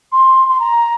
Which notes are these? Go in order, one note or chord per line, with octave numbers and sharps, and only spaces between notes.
C6
C6
A#5